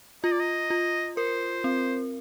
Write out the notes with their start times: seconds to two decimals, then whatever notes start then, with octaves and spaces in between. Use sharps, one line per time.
0.24 F4 D#5
0.32 D5
0.40 D#5
0.70 F4
1.17 A#4 C5
1.64 C4